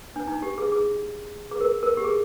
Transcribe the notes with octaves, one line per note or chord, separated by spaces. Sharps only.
D4
D#4
G4
G#4
G#4
G#4
A#4
A#4
G4
G#4